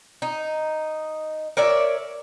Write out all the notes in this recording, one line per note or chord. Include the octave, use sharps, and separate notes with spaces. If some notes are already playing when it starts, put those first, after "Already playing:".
D#4
A#4 C#5 D5 E5